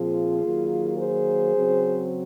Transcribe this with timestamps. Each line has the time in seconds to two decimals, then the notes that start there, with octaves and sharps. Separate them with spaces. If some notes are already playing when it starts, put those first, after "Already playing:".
Already playing: A#2 F3 C4 F4 G#4
0.43 D#3 F#3 A#3
0.99 G#4 C5
1.56 C#3 F#3 C4